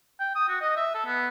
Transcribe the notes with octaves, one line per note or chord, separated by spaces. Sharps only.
G5
D#6
F#4
D#5
E5
A4
B3